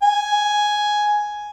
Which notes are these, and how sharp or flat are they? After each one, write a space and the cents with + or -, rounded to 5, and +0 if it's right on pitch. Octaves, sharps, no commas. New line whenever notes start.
G#5 +5